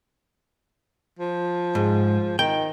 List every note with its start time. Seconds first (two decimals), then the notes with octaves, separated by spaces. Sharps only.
1.19 F3
1.75 G#2
2.39 D#3 G5